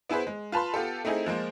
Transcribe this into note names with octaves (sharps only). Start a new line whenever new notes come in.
B3 E4 G#4 B4 C5
G#3
F4 B4 A5 B5 C6
B3 F4 G4 A4
A3 C4 D#4 E4 G#4
F3 G#3 A#3 C5